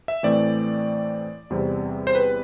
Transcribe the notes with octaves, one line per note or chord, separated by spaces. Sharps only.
E5
A2 E3 A3 C4 D5
E2 C3 G3 C4
C5
B4